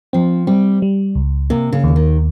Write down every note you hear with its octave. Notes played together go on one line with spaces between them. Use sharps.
F3 C4
G3 C4
G3
C#2
C3 A#3
C#3
D#2
D#3